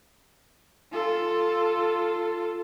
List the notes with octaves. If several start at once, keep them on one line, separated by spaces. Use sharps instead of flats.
F4 A4